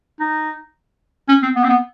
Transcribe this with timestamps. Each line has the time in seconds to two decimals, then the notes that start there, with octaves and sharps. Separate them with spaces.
0.20 D#4
1.29 C#4
1.43 C4
1.56 B3
1.64 C4
1.69 B3